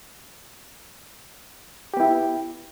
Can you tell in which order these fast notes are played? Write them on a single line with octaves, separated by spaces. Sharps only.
G4 B3 E4